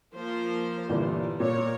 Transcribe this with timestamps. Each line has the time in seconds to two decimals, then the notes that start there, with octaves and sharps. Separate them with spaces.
0.13 F3 A#3 C5
0.89 G1 A#2 E3 G3
1.40 A#2 A#4 C#5